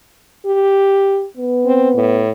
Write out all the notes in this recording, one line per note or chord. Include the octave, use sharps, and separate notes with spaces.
G4
B3
C4
A2